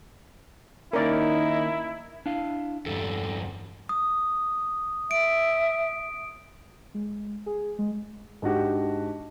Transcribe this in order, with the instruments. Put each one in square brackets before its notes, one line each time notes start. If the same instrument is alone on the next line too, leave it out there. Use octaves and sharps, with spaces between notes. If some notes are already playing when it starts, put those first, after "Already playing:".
[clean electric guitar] D#3 A#3 C#4 [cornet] D#4 [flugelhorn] E4 [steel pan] A#4 D5
[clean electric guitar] D4 E4 F5
[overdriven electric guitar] E2 G2 [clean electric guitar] A4
[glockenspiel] D#6
[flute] E5 [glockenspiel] D7
[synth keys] G#3
G#4
G#3
[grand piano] G#2 D4 F#4 G4